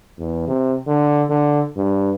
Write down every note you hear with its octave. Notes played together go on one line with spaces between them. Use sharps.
E2
C3
D3
D3
G2